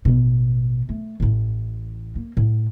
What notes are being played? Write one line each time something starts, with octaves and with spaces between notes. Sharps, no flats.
A1 B2
A3
A1 A2
A#3
A2